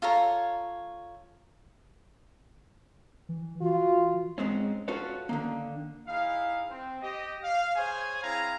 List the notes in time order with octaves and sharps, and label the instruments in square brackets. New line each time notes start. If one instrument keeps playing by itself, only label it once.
[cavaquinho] F4 A4 C#5 A#5
[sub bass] E3
[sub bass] E3 [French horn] F4 [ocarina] F#4
[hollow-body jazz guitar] G#2 G#3 C4 C#4
C#4 F4 F#4 A4 B4 C#5
D3 D#3 A#3
[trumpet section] D#4 E4 G#4 F5
C4
G4 D#5
F5
G#4 C5 C#5 G#5
C4 E4 G#4 F5 G#5 A#5